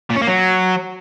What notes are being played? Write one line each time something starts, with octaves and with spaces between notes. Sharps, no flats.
A#2
C#4
A#3
F#3